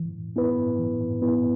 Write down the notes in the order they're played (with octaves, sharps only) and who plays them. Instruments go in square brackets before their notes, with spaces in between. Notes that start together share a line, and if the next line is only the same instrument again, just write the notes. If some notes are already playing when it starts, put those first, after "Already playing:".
Already playing: [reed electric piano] E3
B3 E4 B4
E3
B3 E4 B4